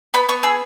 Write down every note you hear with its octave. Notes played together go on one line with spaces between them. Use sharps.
B3 B5
B3 C#6
G#4 E6